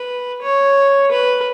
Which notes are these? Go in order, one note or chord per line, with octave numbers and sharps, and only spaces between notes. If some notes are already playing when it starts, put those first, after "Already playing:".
Already playing: B4
C#5
B4